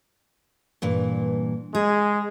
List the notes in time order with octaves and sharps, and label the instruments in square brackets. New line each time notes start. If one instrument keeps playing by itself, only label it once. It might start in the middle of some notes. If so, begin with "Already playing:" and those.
[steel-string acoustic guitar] G2 A#2 E3
[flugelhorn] G#3 [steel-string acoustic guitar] G#4